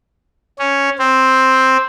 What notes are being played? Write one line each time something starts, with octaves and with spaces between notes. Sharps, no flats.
C#4
C4